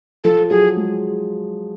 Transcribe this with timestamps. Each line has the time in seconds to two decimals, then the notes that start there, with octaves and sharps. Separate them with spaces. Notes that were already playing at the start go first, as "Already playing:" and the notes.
0.24 F3 A4
0.50 F#3 G#4
0.77 G#3